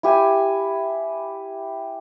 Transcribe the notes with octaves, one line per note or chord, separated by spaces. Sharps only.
E4 G4 G#5